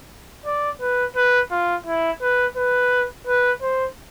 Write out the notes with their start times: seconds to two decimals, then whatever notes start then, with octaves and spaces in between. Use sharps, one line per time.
0.46 D5
0.81 B4
1.16 B4
1.51 F4
1.87 E4
2.22 B4
2.57 B4
3.27 B4
3.62 C5